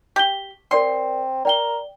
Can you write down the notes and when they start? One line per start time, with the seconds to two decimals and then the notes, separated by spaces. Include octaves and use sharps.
0.16 G4 B6 G7
0.71 C4 A#4 D5 G5 C6
1.45 A#4 D5 G5 G7